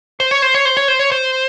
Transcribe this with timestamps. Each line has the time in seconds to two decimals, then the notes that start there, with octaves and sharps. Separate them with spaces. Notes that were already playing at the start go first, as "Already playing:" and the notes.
0.20 C5
0.31 C#5
0.42 C5
0.54 C#5
0.65 C5
0.77 C#5
0.88 C5
0.99 C#5
1.12 C5